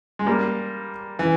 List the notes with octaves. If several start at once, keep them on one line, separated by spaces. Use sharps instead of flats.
G#3
G3 A#3
E3